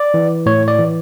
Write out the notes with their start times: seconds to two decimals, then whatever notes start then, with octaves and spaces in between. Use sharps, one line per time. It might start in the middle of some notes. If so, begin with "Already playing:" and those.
Already playing: D5
0.14 E3
0.46 A2 C#5
0.68 D5
0.79 E3